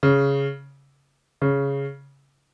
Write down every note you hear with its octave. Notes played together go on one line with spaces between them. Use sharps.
C#3
C#3